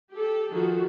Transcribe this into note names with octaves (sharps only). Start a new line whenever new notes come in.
G4 A4
D#3 F3 F#4 G#4 A4